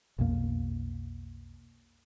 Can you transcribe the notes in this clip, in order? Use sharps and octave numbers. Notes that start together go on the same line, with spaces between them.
B1 F2 B2 A#3